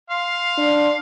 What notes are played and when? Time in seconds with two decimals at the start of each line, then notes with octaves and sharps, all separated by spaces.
0.10 F5 C6
0.58 D4